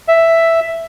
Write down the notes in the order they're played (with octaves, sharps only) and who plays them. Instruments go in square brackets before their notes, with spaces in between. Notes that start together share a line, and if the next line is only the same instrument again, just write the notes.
[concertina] E5